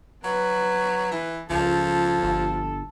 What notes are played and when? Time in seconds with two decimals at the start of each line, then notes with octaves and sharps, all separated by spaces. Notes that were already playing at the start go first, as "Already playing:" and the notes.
0.24 F#3 B4
1.11 E3
1.50 C#2 F3 A4
2.23 G1